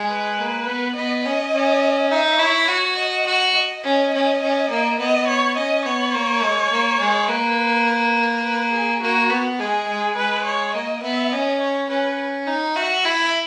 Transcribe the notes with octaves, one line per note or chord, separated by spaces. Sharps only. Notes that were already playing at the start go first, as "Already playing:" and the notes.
Already playing: G#3
B4
A#3
B3
B3 D#5
C#4 D#5
C#4
D#4 E5
E4 C#5
F#4 C#5
D#5
F#4
D#5
C#4 D#5
C#4
C#4
A#3
B3 D#5
C#5
C#4 D#5
B3 C#5
A#3
G#3
A#3
G#3
A#3 B4
B4
G#4
A#3 F#4
B3
G#3 G#4
G#3
G#3 B4
C#5
A#3 D#5
B3 E5
C#4 D#5
C#5
C#4 B4
D#4
F#4 E5
E4 E5